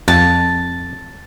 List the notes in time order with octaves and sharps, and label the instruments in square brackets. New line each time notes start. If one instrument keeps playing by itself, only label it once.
[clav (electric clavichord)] F2 [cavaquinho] A5